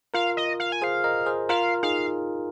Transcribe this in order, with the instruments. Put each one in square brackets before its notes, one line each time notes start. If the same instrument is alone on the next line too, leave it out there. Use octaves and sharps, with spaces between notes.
[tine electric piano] F4 A#4 [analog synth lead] F5
[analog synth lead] D#5
F5
G#5
[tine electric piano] G#4 C5 [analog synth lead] F5
[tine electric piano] A#4 D#5
G#4 C5
[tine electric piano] F4 A#4 [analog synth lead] F5
[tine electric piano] D#4 G#4 [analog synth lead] F5